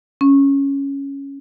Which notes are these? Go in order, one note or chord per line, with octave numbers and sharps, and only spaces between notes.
C#4